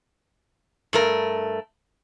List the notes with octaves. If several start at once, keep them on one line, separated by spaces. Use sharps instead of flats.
G2 A3 A#4